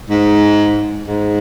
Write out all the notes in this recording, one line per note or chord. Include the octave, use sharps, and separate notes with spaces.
G#2
G#2